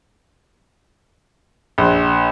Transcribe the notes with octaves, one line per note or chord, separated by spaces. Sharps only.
A#1